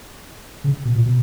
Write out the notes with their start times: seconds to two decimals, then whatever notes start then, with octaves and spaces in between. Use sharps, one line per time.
0.64 C#3
0.85 B2
0.95 A#2
1.06 B2